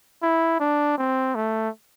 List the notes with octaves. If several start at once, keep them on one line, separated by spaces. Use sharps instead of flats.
E4
D4
C4
A3